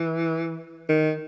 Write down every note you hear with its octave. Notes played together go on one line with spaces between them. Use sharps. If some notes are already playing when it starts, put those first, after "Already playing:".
Already playing: E3
D#3